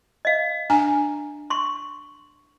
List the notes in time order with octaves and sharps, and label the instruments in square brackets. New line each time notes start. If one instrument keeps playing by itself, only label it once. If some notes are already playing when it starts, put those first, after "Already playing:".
[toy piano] D#5 F5
[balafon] D4 G#5 A#5
[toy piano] C6 C#6